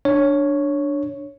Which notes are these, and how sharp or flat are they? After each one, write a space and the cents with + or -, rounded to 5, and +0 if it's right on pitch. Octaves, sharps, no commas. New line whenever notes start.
D4 +0 C#5 +0